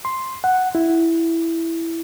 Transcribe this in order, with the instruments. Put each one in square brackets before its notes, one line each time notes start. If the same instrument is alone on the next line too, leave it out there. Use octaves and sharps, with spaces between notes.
[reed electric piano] C6
F#5
E4